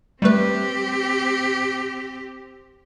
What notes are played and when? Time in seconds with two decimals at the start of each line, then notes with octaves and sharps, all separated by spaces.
0.22 G3 A3 C4 G4 B4